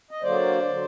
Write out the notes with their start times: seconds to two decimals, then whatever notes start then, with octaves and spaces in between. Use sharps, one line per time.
0.11 D#5
0.23 D3 F#3 A#3 C5 D5
0.69 D3 F#3